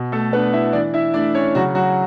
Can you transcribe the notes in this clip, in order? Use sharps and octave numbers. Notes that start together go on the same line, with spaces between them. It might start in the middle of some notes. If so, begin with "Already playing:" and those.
Already playing: B2
A3 A4
A3 B3 D4 B4
E4 E5
E3 D4 D5
E4 E5
A3 D4 D5
C#4 C#5
C#3 F#3 F#4
F#3 F#4